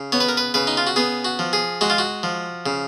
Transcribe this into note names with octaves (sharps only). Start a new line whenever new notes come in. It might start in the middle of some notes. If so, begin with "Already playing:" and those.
Already playing: C#3
B3 C#5
B4
A#4
B4
C#3 B4
D#4
F4
F#4
B3 G#4
F#4
F3
G#4
G#3 F#4
F4
F#4
F3
C#3